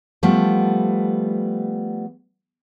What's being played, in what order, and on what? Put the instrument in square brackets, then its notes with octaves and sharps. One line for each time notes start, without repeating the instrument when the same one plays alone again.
[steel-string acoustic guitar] F3 G3 A3 B3